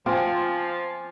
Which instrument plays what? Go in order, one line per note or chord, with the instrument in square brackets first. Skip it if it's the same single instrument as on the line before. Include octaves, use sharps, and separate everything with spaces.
[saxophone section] F3 [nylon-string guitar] C4 [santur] F4 [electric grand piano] G#5 D6